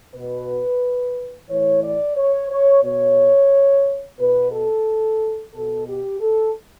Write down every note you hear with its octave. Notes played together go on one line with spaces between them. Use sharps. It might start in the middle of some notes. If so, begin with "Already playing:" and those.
B2 B4
A2 E3 C#5
D5
C#5
C#5
B2 C#5
B2 B4
A4
B2 A4
G4
A4